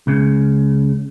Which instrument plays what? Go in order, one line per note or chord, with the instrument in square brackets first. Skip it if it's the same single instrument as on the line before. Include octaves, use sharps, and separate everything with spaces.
[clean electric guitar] C#2 C#3